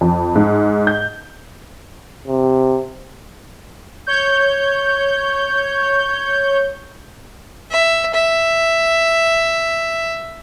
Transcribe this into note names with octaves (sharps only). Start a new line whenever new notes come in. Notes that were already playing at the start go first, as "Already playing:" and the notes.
F2
G#2
G6
C3
C#5 G6
E5
E5